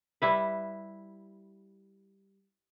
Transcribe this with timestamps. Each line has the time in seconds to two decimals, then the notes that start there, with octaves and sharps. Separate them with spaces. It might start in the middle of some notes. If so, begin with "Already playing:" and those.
0.22 G3 E4 B4